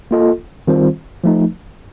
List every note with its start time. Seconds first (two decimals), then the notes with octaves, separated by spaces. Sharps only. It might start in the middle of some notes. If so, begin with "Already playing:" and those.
0.11 A#3 F4 A4 D#5
0.68 D#3 G3 C4 F4 C5
1.24 F3 A3 D#4